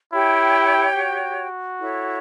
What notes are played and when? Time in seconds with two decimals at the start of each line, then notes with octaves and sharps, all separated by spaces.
0.13 E4 G4 C#5 G5
0.96 F#4
1.79 E4 A4 C#5